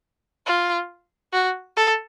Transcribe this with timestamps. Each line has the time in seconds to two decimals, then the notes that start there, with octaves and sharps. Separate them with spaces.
0.47 F4
1.33 F#4
1.76 A4